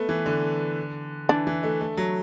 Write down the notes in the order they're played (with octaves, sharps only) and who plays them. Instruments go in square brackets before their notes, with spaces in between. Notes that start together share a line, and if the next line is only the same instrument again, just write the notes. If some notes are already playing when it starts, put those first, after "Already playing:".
Already playing: [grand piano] A3 B3
E3
D3
[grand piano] E3 [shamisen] D4
[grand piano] E3
A3
A3
F#3